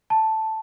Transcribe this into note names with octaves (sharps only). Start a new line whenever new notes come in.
A5